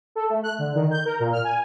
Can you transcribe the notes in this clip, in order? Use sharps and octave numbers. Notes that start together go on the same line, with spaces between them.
A4
A3
F#6
D3
D#3
G6
A#4
A#2
F6
G#5